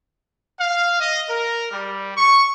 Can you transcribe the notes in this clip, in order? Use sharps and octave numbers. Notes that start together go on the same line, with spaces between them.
F5
D#5
A#4
G3
C#6